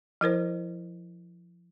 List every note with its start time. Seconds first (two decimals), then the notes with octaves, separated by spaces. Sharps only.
0.21 F3 E4 A#4 C5